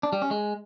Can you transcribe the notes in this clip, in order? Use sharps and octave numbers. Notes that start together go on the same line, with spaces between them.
D4
G3
C#4
G#3